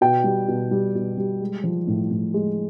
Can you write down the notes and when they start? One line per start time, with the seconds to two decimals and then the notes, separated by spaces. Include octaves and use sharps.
0.01 B2 G5
0.24 G3
0.48 B2
0.71 G3
0.95 B2
1.18 G3
1.41 G#3
1.64 F3
1.87 A2
2.11 A2
2.34 G#3